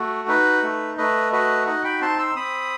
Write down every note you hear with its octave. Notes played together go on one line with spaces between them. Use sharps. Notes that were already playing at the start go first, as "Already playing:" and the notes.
Already playing: A3 F#4
D#4 B4
A3
A3 B4 D#5
F#4 B4 D#5
D#4 D#5 F#5
G5 B5
C4 A5 C6
C6 E6
C4 B5 D#6